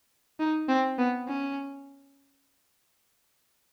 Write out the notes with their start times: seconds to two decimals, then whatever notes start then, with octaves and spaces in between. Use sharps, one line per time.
0.39 D#4
0.69 C4
0.99 B3
1.28 C#4